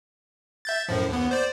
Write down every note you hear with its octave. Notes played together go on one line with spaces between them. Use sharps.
E5 G6 A6
F#2 A2 F3
D#2 B3
C5 D5